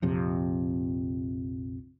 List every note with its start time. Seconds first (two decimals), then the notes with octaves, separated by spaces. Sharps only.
0.02 A#1 F2 C3